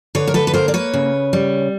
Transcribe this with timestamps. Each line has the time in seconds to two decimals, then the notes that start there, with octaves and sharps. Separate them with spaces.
0.15 D3 B4 C#5
0.27 A#4
0.34 A4 B4
0.47 B4
0.54 A#3 A#4 C5
0.68 D5
0.74 B4 C#5
0.93 C#3
1.33 G3